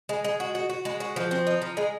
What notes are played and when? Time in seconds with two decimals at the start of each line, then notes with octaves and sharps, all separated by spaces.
0.09 G#3
0.24 G#3
0.40 F#4
0.55 F#4
0.70 F#4
0.85 G#3
1.00 F#4
1.16 F3
1.31 C4
1.47 D#4
1.62 F3
1.77 G#3